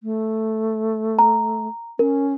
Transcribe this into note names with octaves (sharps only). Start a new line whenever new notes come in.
A3
A#5
C#4 A#4